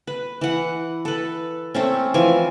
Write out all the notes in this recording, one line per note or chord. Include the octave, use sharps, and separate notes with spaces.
B4
E3 F#5
A4 B4
A3 C4 C#4
E3 F3 G#5